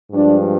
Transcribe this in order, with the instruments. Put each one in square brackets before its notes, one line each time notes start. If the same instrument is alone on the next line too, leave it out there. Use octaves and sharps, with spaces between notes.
[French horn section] G2 F3 G#3 D4